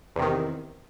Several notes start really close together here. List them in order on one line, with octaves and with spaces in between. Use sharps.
E2 C3 D#3